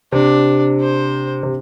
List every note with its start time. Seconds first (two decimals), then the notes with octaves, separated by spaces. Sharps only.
0.12 C3 D4
0.81 C5
1.43 C3